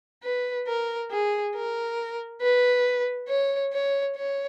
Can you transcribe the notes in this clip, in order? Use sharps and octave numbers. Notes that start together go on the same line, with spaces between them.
B4
A#4
G#4
A#4
B4
C#5
C#5
C#5